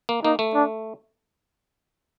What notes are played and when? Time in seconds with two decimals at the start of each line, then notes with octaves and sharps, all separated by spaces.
0.09 A#3
0.23 A#3 D#4
0.39 A3
0.55 D4